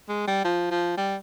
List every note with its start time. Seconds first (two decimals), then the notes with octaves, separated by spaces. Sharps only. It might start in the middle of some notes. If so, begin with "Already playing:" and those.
0.09 G#3
0.27 G3
0.44 F3
0.71 F3
0.97 G3